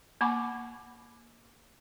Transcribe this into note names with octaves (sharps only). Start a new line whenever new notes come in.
A#3 F#5 G#5 B5 C#6 D6